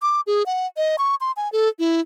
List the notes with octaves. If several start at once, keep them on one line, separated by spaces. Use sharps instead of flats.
D6
G#4
F#5
D#5
C#6
C6
G#5
A4
E4